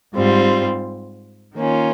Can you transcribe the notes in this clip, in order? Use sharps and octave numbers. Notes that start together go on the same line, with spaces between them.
G#2 G3 C4 F4
D#3 A#3 C#4 F4